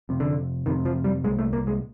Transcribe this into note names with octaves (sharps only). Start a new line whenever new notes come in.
F2 C3
D3
F2 C3 D#3
F3
G3
C2 A#2 G#3
A3
A#3
G#3